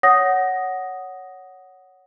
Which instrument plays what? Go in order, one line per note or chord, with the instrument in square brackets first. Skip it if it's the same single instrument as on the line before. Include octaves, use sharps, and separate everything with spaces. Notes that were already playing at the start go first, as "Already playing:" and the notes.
[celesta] C#5 F#5 D#6 A#6